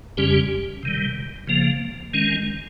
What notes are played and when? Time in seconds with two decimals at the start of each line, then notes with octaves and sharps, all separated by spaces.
0.17 F2 C#3 G3 C#4 G4
0.83 C3 D#3 G3
1.47 C#3 F3 A#3
2.14 D#3 G#3 C#4